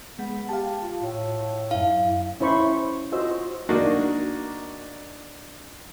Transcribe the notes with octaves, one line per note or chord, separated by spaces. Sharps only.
G#3 B3
G4 F5 A5
F4
A2
F#2 E4 F5
C#4 E4 C5 B5 C#6
F4 F#4 C5 D#5 E6
A#3 D4 D#4 F#4